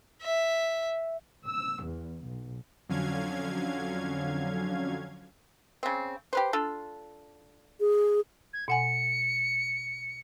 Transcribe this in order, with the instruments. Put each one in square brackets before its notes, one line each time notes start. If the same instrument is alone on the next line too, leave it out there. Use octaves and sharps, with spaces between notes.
[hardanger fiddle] E5
[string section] E6
E2
B1
[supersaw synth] F2 D3 F#3 C#4 F5 G#6
[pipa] C#3 C4
G4 B4 C5
D4 F4 A4
[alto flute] G#4
[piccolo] G#6
[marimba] B2 F#5 G#5 [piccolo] C#7